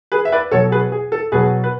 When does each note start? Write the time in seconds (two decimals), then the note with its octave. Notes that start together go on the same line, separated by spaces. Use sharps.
0.12 G#4 B4
0.25 E5
0.32 B4 D5
0.51 B2 F#3 A4 C#5
0.72 G#4 B4
0.92 G#4
1.12 A4
1.32 B2 F#3 G#4 B4
1.64 B4